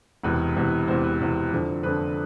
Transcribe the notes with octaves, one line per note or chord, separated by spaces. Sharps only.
E1 E2 C3 B4
E1 E2 C3
E1 E2 C3 C5
B4
E1 E2 C3
F2 D3 F3 C4
F2 D3 F3 C4 B4